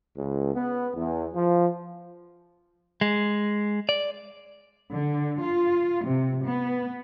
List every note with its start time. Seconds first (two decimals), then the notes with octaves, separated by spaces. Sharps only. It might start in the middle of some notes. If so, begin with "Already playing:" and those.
0.18 C#2
0.54 B3
0.94 E2
1.34 F3
3.01 G#3
3.89 D5
4.91 D3
5.41 F4
6.06 C3
6.46 B3